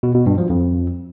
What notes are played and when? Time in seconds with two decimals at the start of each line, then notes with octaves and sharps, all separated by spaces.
0.03 B2
0.15 B2
0.26 G2
0.38 F3
0.50 F2